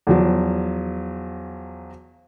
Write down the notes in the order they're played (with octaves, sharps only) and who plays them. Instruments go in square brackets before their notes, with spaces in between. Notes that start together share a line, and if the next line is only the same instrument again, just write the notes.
[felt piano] E2 F3 F#3